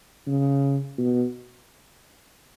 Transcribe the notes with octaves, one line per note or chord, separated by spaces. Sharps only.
C#3
B2